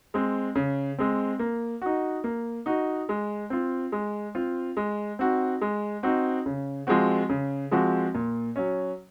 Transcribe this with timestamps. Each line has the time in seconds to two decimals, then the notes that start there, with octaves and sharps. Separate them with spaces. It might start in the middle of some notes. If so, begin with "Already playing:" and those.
0.14 G#3 C4
0.55 C#3
0.99 G#3 C4
1.39 A#3
1.82 D#4 F#4
2.24 A#3
2.66 D#4 F#4
3.09 G#3
3.50 C4 F4
3.92 G#3
4.35 C4 F4
4.77 G#3
5.19 C4 D#4 F#4
5.61 G#3
6.03 C4 D#4 F#4
6.46 C#3
6.87 F3 G#3 C4 F#4
7.29 C#3
7.71 F3 G#3 C4 F#4
8.14 A#2
8.56 F#3 C#4